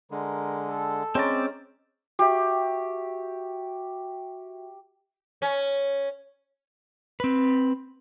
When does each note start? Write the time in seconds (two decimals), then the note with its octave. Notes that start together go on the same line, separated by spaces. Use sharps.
0.11 D3 G#3 A#4
0.69 A4
1.15 G#3 C4 C#4 D5 A#5
2.19 F#4 G4 E5
5.42 C#4
7.20 C4 B4